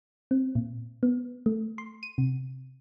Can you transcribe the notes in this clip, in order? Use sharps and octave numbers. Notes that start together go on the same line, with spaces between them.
C4
A#2
B3
A3
C6
D#7
C3